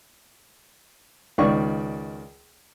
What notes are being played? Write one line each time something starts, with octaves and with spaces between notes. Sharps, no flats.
C#2 D#3 D5 C#6